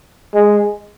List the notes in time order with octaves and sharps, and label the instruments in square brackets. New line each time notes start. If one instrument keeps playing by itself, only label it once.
[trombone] G#3